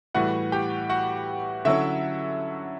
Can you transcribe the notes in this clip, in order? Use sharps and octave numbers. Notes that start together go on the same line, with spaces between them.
A2 E3 G3 F#4 F#5
G4 G5
F#4 F#5
D3 F#3 C#4 E4 E5